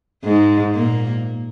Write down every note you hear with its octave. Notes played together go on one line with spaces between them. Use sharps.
G#2 G#3
A#2 A#3